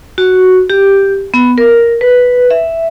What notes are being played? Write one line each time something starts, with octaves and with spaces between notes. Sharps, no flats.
F#4
G4
B3
A#4
B4
E5